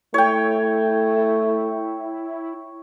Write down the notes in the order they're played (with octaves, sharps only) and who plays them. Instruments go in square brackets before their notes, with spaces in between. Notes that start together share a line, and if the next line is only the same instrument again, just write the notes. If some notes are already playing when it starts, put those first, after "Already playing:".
[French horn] A3 [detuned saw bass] E4 [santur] C#5 G5